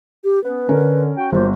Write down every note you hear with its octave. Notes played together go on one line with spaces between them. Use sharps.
G4
B3 C#4 B4
D3 C#4 A#4
F#4 G5
G1 F#2 A#3 F4 C5